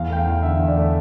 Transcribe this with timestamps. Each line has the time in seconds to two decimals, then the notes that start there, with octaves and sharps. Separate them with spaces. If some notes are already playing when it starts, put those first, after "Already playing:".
Already playing: E2 F5
0.08 A3 G5
0.17 F5
0.26 E2
0.42 D3 E5
0.60 E2
0.68 D5
0.76 A3